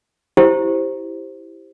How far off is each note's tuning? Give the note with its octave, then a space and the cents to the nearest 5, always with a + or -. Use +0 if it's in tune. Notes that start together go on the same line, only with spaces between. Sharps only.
E4 +0 G4 +0 C5 +0